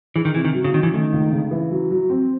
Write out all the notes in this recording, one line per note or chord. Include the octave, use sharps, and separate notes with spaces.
E3 G#4
D#3
C3 E3
D#3
F#3
C#3
D#3 C#4
E3
D#3 A3
C#2
C#3
E3
F#3
F#3
C4